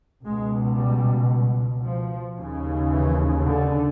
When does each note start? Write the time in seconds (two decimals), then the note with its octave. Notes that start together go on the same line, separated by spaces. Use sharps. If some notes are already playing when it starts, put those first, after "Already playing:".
0.24 C#2 B2 G#3
0.78 G3
1.85 F3
2.37 D#2 C#3
2.91 E3
3.43 D3